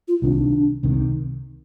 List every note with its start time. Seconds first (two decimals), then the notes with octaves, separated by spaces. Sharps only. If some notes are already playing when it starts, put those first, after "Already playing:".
0.08 F4
0.22 C2 C3 D#3 D4
0.83 C2 C3 D#3